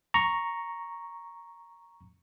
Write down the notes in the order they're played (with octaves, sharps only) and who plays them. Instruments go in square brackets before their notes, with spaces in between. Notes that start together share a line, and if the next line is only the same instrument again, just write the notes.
[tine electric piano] A#5 C#6